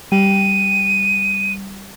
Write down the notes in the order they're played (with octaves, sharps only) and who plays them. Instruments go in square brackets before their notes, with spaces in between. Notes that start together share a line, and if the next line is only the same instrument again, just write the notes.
[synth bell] G3 [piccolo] D#7